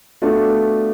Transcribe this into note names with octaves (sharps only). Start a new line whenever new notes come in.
A3 B3 D4 F4 F#4 A4